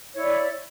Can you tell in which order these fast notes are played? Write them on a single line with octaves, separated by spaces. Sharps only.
C#5 E4 D5